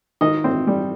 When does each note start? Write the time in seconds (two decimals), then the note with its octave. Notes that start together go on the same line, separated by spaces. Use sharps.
0.21 D#3 D#5
0.44 C4
0.67 G3